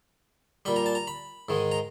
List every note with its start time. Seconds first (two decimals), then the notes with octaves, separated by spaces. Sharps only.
0.65 A#2 G3 B5
0.76 A#5
0.86 A5
0.95 A#5
1.07 B5
1.49 G#2 D#3 G#3
1.72 A#5